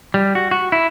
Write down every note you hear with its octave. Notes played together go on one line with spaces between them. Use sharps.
G3
F#4
F#4
E4